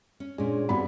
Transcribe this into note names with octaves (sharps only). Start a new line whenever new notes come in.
C#4
A#2 G#3 C#4 D4 G#4
G2 B3 C4 F#4 G#4 B5